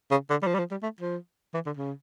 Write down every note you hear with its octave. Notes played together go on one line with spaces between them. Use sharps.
C#3
D3
G3
F3
G3
F3
G3
A3
F3
E3
D3
C#3